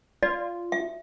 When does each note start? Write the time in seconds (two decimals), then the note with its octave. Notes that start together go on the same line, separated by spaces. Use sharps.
0.23 F4 D5
0.72 E5